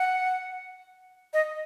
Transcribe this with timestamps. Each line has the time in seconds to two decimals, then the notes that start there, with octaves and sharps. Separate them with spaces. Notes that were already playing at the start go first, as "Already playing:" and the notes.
Already playing: F#5
1.34 D#5